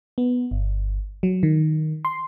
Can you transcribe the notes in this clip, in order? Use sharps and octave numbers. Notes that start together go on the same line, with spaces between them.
B3
G1
F#3
D#3
C6